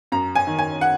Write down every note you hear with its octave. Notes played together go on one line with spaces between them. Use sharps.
F#2 A#5
G#5
D#3
G#5
F#5